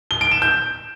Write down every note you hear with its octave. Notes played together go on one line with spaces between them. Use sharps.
G7
D7
E7
G6